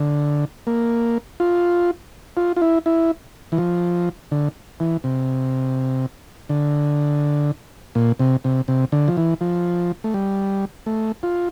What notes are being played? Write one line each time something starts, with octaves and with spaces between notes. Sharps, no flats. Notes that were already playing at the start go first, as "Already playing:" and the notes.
Already playing: D3
A#3
F4
F4
F4
E4
E4
E3
F3
D3
E3
C3
D3
A#2
C3
C3
C3
D3
F3
E3
F3
A3
G3
A3
F4